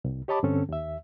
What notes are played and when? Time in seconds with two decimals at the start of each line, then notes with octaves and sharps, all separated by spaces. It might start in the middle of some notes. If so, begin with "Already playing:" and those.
0.05 C2
0.28 G4 C#5 D#5 A5 B5 D6
0.43 G2 D3 C4 C#4 A4
0.69 D#2 E5